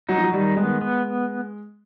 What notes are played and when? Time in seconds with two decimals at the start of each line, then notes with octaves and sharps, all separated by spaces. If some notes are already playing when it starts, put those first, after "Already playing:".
0.09 F#3 D#4
0.17 F3
0.23 F#3
0.33 D#3 G3
0.56 G#3 B3
0.81 B3